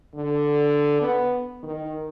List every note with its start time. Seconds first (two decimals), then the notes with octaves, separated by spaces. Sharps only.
0.16 D3
1.01 B3
1.63 D#3